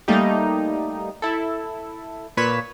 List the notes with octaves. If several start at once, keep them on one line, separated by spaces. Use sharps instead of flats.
G3 A3 A#3 D#4 G4
E4 A4
A#2 B4 C#5 B6 E7